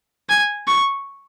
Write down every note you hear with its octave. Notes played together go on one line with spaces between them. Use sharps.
G#5
C#6